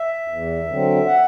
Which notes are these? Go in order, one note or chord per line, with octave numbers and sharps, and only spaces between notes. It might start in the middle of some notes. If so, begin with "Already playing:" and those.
Already playing: E5
E2
D3 F#3 C4
F#5